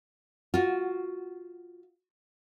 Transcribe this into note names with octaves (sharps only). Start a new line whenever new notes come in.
F4 F#4